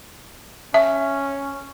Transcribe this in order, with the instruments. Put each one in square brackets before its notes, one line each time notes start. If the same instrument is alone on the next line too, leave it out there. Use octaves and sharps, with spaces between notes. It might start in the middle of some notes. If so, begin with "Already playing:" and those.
[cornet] C#4 [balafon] E5